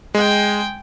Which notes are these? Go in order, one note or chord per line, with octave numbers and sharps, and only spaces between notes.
G#3 G5 G#5